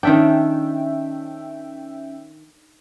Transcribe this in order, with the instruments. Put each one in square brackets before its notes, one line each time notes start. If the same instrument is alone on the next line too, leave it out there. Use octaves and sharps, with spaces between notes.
[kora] D#3 D4 [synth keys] C#4 E5 G5